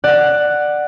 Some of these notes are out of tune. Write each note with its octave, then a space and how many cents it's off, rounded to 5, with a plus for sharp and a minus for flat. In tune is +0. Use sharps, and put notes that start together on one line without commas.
D5 +15 F#5 +0